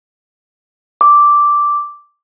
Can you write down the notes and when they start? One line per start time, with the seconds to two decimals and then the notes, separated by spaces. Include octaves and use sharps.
1.01 D6